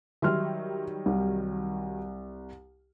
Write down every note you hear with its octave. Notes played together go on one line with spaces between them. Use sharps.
D#3 F#3 G3 E5 C6 F6
C2